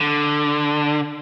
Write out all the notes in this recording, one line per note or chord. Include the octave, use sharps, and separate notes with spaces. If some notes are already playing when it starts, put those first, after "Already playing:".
D3